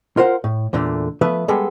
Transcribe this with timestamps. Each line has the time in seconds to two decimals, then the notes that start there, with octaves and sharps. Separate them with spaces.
0.17 F4 A#4 C5 F#5
0.44 A2
0.73 E2 A#2 D3 A3
1.21 F3 A3 B3 B4 E5
1.48 G3 G#3 B3 G#4 A4